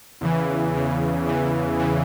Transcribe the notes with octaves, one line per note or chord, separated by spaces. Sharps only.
E2 C#3 E3
E2 C#3 E3
E2 C#3 E3
C#3 E3